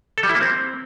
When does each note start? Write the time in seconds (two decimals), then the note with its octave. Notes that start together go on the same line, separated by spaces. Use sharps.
0.18 A4
0.23 G3
0.29 E4
0.35 A#3
0.41 C4